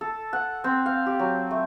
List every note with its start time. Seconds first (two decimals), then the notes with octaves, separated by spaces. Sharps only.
0.01 A4
0.33 F#5
0.64 C4
0.86 F5
1.06 G4
1.19 F#3
1.51 A3